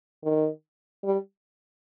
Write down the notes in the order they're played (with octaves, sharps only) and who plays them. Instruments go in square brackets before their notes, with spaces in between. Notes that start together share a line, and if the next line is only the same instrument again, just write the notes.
[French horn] D#3
G3